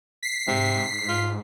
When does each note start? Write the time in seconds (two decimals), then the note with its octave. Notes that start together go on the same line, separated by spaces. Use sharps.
0.23 B6 C7
0.48 G#2 C3
1.09 F4